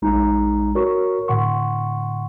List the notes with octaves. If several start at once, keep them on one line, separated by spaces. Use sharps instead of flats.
A#1 G#3 D#4 A#5
F#4 A#4 C#5 C#6
A2 D3 F#5 C6 C#6